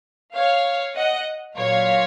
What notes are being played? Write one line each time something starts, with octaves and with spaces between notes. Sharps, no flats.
C#5 F5
D#5 F#5
A#2 F#3 C#5 F5